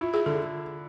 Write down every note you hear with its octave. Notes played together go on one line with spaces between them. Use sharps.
E4 F4
G#4
D3 A4